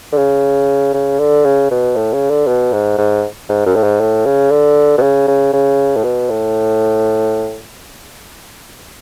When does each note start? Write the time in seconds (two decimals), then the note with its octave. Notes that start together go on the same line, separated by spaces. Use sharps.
0.12 D3
0.18 C#3
0.94 C#3
1.19 D3
1.45 C#3
1.71 B2
1.96 A2
2.13 C#3
2.30 D3
2.47 B2
2.73 G#2
2.98 G#2
3.49 G#2
3.66 F#2
3.76 A2
3.83 G#2
4.00 A2
4.26 C#3
4.51 D3
4.98 B2
5.02 C#3
5.28 C#3
5.53 C#3
5.96 A2
6.04 B2
6.30 A2